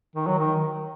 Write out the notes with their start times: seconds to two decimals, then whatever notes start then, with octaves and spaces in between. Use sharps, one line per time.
0.16 D#3
0.27 F#3
0.39 D#3